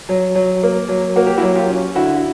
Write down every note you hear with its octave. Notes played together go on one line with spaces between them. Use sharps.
F#3
F#3
A#3
F#3
A#3 F#4
G4
E4 F#4
F#3
F4 G4
C#4
D3 E4 F#4